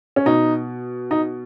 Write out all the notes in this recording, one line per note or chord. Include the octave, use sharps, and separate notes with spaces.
C#4
B2 D#4
D#4